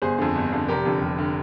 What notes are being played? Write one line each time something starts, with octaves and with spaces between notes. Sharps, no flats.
G1 G#4 C5
F2 D3
G1
F2 D3
F1 G4 A#4
F2 D3
F1
D3